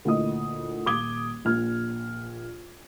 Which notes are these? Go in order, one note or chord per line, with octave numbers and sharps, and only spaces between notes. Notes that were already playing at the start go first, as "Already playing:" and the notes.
D2 A#2 E3 D#5 D#6
D#1 D6 D#6 G#6 G7
A#1 F6 G#6